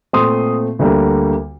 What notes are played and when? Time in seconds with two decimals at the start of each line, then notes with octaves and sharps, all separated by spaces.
0.13 A#2 A3 C4 C6 D#6
0.79 D2 D3 G3 A#3